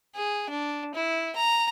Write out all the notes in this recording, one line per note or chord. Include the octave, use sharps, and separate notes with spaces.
G#4
D4
E4
A#5